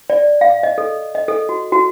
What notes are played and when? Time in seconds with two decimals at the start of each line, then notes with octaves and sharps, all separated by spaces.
0.10 D5
0.41 F5
0.63 D#5
0.78 A4
1.15 D#5
1.28 A4
1.49 F#4
1.72 F#4